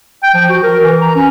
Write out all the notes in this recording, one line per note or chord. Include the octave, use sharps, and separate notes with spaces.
G5
F3
F#4
A#4
E3
A#5
C#4